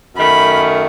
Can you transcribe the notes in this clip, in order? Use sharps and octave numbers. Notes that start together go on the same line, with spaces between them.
F#2 D#3 A3 B5